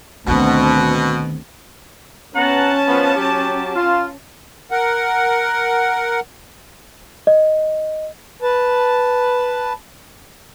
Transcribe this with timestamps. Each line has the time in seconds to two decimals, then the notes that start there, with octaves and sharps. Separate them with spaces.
0.27 D2 B2 D#3 B3 C4
2.36 B3 C#4 F#5 A5 A#5
2.87 F3 B3
3.17 F#3 G4
3.75 F4
4.71 A#4 F#5
7.27 D#5
8.42 B4 A5